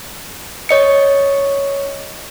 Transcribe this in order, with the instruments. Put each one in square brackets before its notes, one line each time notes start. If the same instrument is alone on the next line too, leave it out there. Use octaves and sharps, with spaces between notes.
[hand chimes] C#5 D#5 C#7